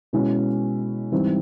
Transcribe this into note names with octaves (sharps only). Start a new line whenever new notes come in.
B2 G#3 C#4 E4
G#2 E3 G3 C4